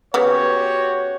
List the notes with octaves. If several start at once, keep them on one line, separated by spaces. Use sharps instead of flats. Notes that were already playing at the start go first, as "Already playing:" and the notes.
C#3 B3 F#4 G4 C#5